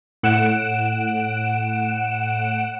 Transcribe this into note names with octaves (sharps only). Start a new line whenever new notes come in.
A2 F#5 D7 E7